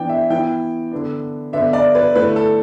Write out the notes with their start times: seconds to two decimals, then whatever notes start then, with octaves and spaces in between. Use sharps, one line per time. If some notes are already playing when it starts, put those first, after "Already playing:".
Already playing: E3 B3 D4 G5
0.09 E5
0.30 E3 B3 E4 G5
0.91 D3 B3 D4
1.53 D3 B3 D4 E5
1.73 D5
1.95 B4
2.15 D3 A3 E4 B4
2.36 A4